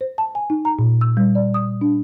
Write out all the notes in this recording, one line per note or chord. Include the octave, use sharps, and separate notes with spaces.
C5
A5
G#5
D#4
A#5
A#2
E6
G3
D5
D#6
D4